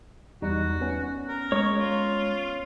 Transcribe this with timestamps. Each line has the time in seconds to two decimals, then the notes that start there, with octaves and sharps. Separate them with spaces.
0.42 E2 G3 D#4 F#4
0.81 B3 C#4
1.28 A#4
1.52 G#3 C#5 C#6
1.78 F4